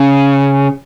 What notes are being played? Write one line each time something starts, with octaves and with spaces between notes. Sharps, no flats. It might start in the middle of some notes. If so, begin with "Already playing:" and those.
Already playing: C#3